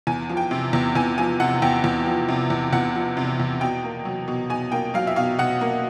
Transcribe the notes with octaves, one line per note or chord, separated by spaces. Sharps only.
E2 G#5
F3
G5
C3
E2
E2 G#5
F3 G#5
C3 F#5
E2 G5
E2
F3
C3
E2
E2 F#5
F3
C3
E2
B2 G5
A#3
F#3
B2
B2 G#5
A#3 G5
F#3 F5
E5
B2 F5
B2 F#5
A#3